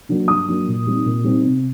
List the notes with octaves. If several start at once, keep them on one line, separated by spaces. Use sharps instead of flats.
F#3 A#3 D4
G2 D#6
F#3 A#3 D4
A#2
G3 C4 D#4
A#2
G3 C4 D#4
C3